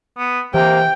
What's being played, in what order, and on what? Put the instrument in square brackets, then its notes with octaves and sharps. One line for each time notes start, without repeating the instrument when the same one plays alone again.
[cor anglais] B3
[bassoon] C3 [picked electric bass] E3 [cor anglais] A#3 [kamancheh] G5